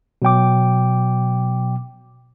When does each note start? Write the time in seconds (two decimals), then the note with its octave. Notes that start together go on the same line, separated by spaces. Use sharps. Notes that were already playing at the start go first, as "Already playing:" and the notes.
0.22 B2 F#3 G5 D6